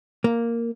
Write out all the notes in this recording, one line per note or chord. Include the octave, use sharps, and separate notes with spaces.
A#3